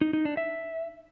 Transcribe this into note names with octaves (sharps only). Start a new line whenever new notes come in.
D#4
D#4
D4
E5